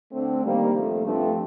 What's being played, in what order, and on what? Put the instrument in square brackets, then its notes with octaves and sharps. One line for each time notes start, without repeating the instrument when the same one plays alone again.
[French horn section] D3 A3 C4
D#3 G3 A#3
C3 F3 A3
G2 F3 A3 C4